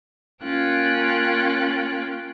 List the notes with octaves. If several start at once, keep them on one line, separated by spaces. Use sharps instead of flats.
A#3 C#4 F4 G5 F#6